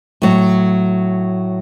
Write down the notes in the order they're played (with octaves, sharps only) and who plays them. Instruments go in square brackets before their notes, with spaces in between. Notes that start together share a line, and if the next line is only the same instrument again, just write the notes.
[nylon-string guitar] A2 F#3